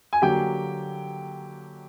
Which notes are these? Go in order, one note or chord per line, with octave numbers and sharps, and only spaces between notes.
G#5
D3 F#3 A#3 G4 G5